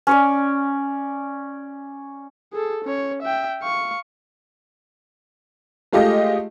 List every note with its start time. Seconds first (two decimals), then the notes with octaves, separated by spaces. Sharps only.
0.07 C#4 C#5 D5
2.53 G#4 A4
2.84 C#4 C#5
3.22 E5 G5
3.62 F5 C#6
5.93 G#3 A3 F4 G4 D#5